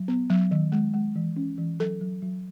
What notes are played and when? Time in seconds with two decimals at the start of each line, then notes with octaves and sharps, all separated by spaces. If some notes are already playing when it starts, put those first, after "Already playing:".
Already playing: F#3
0.08 B3
0.30 F#3
0.51 D#3
0.72 G#3
0.94 G#3
1.16 E3
1.36 C#4
1.58 E3
1.79 F#3 A4
2.01 F#3
2.22 F#3